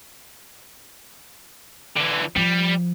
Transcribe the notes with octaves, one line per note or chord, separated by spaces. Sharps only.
D3 E3
F3 G3